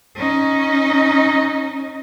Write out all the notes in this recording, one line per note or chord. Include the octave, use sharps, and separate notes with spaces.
C#4 D#4